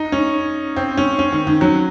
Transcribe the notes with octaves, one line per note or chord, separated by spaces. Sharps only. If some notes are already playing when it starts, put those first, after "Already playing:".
Already playing: D#4
C#4
C4
C#4
C#4
D#3
D#3
F#3